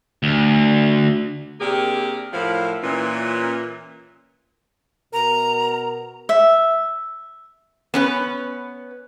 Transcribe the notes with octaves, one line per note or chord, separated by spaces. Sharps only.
D2
C3 A#3 D4 G4 G#4 A#4
A2 F3 F#3 E4 A#4 F5
A#2 E3 C#4
B2 A#4 A#5
E5
B3 C#4 B4